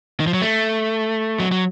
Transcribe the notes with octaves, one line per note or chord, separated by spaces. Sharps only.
D#3
F3
F#3
A3
F#3
F#3